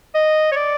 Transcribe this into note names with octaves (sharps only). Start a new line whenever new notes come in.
D#5
C#5
D5